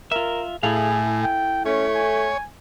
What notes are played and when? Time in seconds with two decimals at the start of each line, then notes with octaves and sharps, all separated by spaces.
0.12 F4 A#4 E5
0.63 A2 E4 G#4 A4 F5 G#5
1.24 G5
1.66 A3 C#4 C#5
1.95 G#5